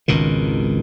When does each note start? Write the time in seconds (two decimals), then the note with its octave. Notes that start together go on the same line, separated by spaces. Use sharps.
0.08 G#1 C#2 B2 D#3